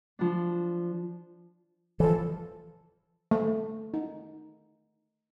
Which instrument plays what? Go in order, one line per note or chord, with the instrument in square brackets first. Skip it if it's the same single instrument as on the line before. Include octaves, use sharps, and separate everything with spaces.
[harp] F3 D4
[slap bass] E3 F3 [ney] A4
[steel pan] A3
D#4